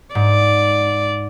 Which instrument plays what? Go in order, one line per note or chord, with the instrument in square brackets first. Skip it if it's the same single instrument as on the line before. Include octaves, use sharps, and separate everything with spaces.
[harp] G#2 [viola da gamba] D5